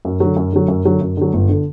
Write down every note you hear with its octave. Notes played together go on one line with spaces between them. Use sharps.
F#2
D3 F#3
F#2
D3 F#3
F#2
D3 F#3
F#2
D3 F#3
G1
D3